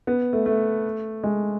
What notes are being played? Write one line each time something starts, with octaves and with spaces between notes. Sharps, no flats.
B3
A3
A3
G#3